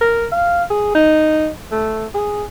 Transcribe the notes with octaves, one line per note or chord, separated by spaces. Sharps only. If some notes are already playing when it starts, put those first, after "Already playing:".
A#4
F5
G#4
D#4
A3
G#4